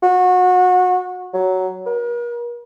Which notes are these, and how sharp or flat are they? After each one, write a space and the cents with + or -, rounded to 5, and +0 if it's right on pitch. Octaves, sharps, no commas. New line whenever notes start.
F#4 -25
F#3 +10
A#4 +40